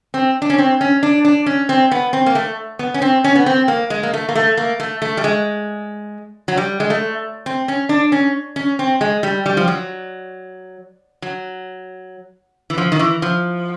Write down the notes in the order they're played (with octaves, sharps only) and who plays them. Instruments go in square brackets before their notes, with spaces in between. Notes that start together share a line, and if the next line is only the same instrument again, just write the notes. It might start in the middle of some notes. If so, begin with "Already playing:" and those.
[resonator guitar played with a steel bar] C4
D4
C#4
C4
C#4
D4
D4
C#4
C4
B3
C4
A#3
A3
B3
C#4
C4
C#4
B3
C4
A#3
G#3
A#3
A3
A#3
A3
A#3
A3
A3
G3
G#3
F#3
G3
G#3
A3
C4
C#4
D4
C#4
C#4
C4
G#3
G3
G3
F3
F#3
F#3
E3
F3
D#3
E3
F3